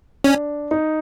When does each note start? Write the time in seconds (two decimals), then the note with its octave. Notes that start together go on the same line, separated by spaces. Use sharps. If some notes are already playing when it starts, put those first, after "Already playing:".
0.24 C#4 D4
0.71 D#4